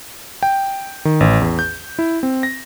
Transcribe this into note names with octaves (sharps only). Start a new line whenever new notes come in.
G5
D#3
A1
E2
G6
E4
C4
A#6